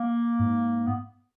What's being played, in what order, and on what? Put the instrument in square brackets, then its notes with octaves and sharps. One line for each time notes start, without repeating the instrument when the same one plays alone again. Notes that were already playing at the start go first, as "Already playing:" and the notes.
Already playing: [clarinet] A#3
[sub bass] G#2
[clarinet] B3